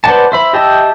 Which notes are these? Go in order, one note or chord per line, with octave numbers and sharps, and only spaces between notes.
B4 C5 D5 F#5 A5
C5 E5 B5
G4 D#5 E5 G5 A5